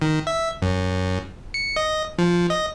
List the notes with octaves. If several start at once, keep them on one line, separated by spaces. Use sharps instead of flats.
D#3
E5
F#2
C#7
D#5
F3
D#5